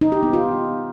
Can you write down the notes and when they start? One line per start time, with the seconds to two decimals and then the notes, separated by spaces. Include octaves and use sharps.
0.01 D#4
0.12 G4
0.23 B3
0.33 F4